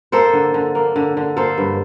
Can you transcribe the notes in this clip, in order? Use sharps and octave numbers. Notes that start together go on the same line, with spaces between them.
A#3 A4 C5
D3
D3
A#3
D3
D3
A#3 A4 C5
G2